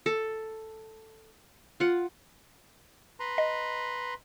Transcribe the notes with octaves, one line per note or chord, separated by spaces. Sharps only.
A4
F4 F#5
B4 A#5 C6
D#5